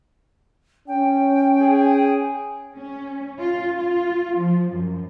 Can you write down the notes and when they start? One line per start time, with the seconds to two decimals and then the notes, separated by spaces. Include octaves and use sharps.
0.88 C#4 G5
1.61 G#4
2.77 C#4
3.40 F4
3.79 F4
4.38 F3
4.72 F#2